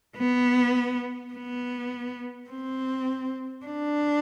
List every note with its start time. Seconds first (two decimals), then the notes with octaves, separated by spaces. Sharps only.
0.17 B3
1.34 B3
2.50 C4
3.66 D4